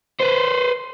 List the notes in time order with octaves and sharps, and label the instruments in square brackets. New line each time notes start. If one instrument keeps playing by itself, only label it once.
[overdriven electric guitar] B4 C5